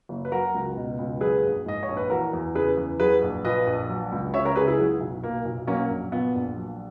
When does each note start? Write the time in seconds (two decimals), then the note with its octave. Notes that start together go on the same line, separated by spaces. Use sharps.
0.09 F#1
0.25 B4
0.31 F#3 F#4 A#4
0.54 C#2
0.77 B2
0.98 C#2
1.21 F#3 G#4 B4
1.44 A#1
1.66 G#2 D#5
1.83 C#5
1.88 A#1
1.97 B4
2.10 E3 F#4 A#4
2.33 E2
2.55 C#3 G#4 B4
2.77 E2
3.00 F#3 G#4 B4
3.22 A#1
3.45 A#2 B4 D#5
3.67 A#1
3.89 F#3
4.12 C#2
4.34 C#3 C#5 E5
4.45 A#4 C#5
4.56 C#2 G#4 B4
4.67 E4 G#4
4.79 F#3
5.00 B1
5.23 A#2 A#3
5.45 B1
5.67 F#3 A#3 C#4
5.90 A#1
6.12 A#2 B3
6.35 A#1
6.57 F#3